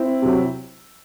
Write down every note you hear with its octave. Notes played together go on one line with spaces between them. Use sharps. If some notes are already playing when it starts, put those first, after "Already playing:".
Already playing: C4 E4
C3 F#3